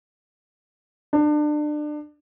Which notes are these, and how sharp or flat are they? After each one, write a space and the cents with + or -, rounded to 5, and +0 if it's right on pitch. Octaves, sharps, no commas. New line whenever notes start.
D4 +30